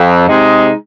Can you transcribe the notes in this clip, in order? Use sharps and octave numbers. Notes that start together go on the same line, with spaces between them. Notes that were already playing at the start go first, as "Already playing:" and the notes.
Already playing: F2
C3 G#3 D#4 G#4